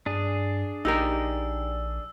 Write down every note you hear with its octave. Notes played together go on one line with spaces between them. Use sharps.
G2 D4 G#4
A#1 D#4 G4 A#4 E6